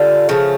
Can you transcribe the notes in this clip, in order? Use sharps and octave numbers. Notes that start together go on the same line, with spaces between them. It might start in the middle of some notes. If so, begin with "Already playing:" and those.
Already playing: D3 G3 F4 A4
C#3 F3 A3